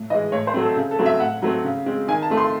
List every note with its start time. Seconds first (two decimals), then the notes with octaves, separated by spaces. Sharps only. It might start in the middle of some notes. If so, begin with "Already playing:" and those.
Already playing: A2
0.10 E3 D#5
0.14 G#3
0.32 A2 C#5
0.47 C5
0.54 F#3 A3 C4
0.62 A4
0.76 C#3 G#4
0.91 A4
0.99 F#3 A3 C4
1.06 E5
1.20 A2 F#5
1.42 F#3 A3 C4
1.64 C#3
1.86 G#3 C4
2.08 D#3 G#5
2.22 A5
2.30 A3 C4
2.37 C6